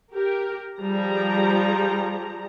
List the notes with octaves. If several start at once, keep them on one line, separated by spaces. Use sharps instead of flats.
G4 A#4
F3 G3 G#4 A#5